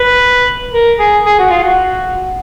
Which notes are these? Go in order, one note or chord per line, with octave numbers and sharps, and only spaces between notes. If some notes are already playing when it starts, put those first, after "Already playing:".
Already playing: B4
A#4
G#4
G#4
F#4
F4
F#4